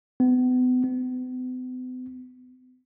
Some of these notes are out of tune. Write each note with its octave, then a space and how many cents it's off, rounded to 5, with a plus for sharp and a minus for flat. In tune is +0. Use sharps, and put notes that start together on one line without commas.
B3 +35
B3 +45